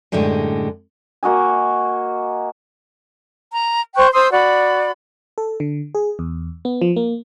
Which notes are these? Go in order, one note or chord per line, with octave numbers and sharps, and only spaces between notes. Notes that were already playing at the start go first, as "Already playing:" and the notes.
F#2 A2 D3 G3 G#3
A#3 F#4 D#5 G#5
A#5
C5 G5 C#6 F#6
C5 C6 D#6 E6
F#4 D5 B5
A4
D3
G#4
E2
B3
F3
A#3